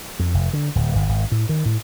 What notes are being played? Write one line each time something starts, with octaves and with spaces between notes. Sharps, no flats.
F2
F1
D3
D1
G1
G#1
A2
D#3
A2